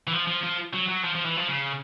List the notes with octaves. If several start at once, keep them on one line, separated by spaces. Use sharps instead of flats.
E3
F3
F3
F3
F#3
F#3
F3
F3
E3
F3
C#3